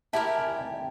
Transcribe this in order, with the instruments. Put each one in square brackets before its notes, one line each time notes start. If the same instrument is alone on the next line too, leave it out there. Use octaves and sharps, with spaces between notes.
[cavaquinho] E4 G4 A#4 [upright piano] A5
[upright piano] G#5
G5
G5